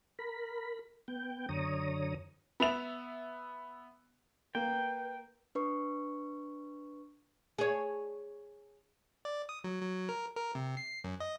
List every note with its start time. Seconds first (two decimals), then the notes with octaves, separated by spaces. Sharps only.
0.19 A#4 B5
1.08 B3 G5
1.49 F#2 D3 C#5 A#5 D#6
2.60 B3 E5 F7
4.55 A#3 B4 G5
5.55 D4 B4 C#6
7.58 G#4 C#5
9.25 D5
9.49 D#6
9.64 F#3
9.82 F#3
10.09 A#4
10.36 A#4
10.55 C3
10.77 C7
11.04 F#2
11.20 D#5